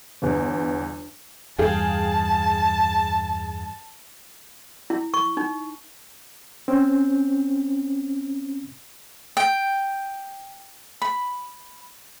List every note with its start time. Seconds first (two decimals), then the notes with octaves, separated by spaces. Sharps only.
0.22 G1 E2
1.59 E2 G2 G#4 F5 G5 A5
4.90 E4
5.14 C#6
5.37 D#4
6.68 C4 C#4
9.37 G5
11.02 B5